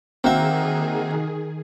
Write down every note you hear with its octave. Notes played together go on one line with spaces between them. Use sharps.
D#3 A#3 C4 F#4 G#4 E5